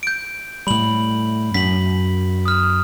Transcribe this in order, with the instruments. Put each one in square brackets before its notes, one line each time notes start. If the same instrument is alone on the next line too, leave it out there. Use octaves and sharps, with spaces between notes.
[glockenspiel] G6 D7
[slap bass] A2 G3 [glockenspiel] B5 F#7
[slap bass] F#2 [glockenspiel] B6 F#7
[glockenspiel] D#6 F6